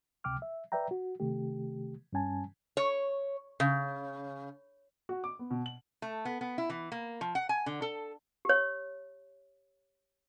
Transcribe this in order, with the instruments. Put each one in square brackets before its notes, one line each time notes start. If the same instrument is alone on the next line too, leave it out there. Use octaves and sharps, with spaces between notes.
[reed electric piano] C#2 C3 G5 D6 F6
E5
B4 D5 E5 G5 A#5
F#4
C3 D#3 A3 G4
G2 G3 C#4 G#5 A5
[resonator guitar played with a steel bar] C#5
C#3
[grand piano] F#4
D6
B3
B2
F#7
[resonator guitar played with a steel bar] A3
B3
B3
E4
E3
A#3
F3
F#5
G#5
D3
A4
[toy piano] G4 C#5